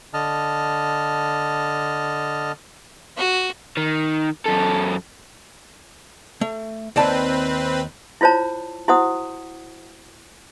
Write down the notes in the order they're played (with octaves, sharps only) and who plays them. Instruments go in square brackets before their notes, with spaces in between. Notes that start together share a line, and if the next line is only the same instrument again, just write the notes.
[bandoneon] D3 D#5 A5 F6
[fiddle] F#4
[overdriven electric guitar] D#3
F#2 A4
[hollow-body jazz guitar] A3
[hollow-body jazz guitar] D#2 D5 A5 [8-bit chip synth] C4 B4
[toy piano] E4 F4 C5 C#5 A5
E4 F#4 C5 F#5 D#6